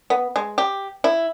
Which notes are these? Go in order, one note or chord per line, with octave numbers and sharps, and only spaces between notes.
B3
G#3
G4
E4